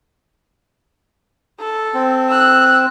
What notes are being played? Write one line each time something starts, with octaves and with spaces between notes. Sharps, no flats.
A4
C4
E6 F#6